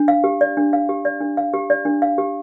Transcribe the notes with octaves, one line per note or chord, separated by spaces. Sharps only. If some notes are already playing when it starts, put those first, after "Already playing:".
Already playing: D4
F5
G4
D5
D4
F5
G4
D5
D4
F5
G4
D5
D4
F5
G4